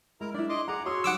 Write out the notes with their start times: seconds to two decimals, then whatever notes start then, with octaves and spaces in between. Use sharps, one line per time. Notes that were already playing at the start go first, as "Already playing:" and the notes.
0.21 G#3 E4 A#4 A#5
0.34 D4 E4 D5
0.49 D#5 C6 D6
0.68 G#4 F#5 A#5 D6
0.85 F#4 C#5 C6 D#6 E6
1.04 F#3 G3 D#4 F#5 D6 E6